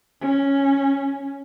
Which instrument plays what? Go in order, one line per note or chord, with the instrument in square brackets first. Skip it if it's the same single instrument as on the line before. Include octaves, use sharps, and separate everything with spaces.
[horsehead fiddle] C#4